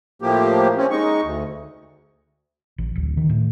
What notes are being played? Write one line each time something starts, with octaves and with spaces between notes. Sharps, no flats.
A2 F3 A#3 G4
C4 C#4
G#3 D#4 C#6
D2
A1
D1
D#3
A2